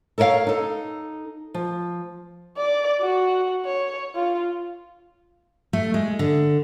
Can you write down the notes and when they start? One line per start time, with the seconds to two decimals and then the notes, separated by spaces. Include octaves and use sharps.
0.18 A4 A#4 C#5 D#5 F5
0.47 D#4 A4
1.54 F3
2.57 D5
3.01 F#4
3.65 C#5
4.15 F4
5.73 A3
5.94 G#3
6.19 D3